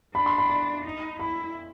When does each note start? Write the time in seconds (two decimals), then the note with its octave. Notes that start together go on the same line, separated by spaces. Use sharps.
0.15 D4 B5
0.26 C6
0.38 B5
0.50 B5
0.85 D#4
1.19 E4 B5